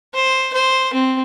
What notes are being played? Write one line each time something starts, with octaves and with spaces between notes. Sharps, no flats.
C5
C5
C4